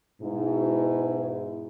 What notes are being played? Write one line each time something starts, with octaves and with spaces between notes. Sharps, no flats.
G#2 B2 E4